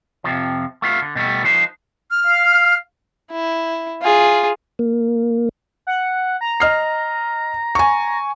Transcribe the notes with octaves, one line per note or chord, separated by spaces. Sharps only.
F2 A2 C3 F3
A3 B3 F4
D3
B2 G3 A3 B3
F3 D#4 B4 C5
F6
F5
E4
F4 G#4
A#3
F#5
A#5
D#5 F6 C7
G#5 C#6